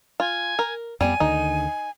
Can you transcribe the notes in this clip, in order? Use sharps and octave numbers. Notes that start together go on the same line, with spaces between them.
F4 G#5
A#4
F2 G3 B3 G#5 D#7
D2 D3 D#3 D#4